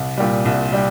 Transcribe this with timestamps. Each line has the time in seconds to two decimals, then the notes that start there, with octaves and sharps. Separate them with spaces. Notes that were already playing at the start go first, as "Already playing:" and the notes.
Already playing: C2
0.18 A#2 G3
0.45 C2
0.72 G3